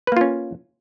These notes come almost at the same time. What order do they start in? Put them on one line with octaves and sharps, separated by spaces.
B4 A#3 F4 C#4